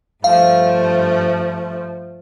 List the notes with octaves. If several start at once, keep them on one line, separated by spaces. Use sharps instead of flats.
G2 F3 A3 F5